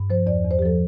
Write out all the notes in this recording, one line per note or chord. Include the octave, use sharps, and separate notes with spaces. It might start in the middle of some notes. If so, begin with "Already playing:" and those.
Already playing: G2
F3 C5
E2 D5
E2
C5
G4
F3 A4